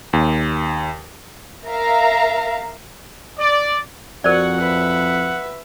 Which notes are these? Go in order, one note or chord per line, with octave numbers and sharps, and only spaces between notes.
D#2
A#4 E5 F5 A#5
D5
F2 F#4 A#4 C5 D5 F#5
B4 E5